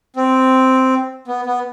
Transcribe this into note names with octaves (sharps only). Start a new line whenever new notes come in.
C4
B3
B3